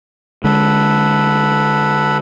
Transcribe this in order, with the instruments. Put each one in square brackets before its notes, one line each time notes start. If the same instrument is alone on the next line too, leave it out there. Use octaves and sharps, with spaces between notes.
[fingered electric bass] D3 G#3 [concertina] A4 F#5 B5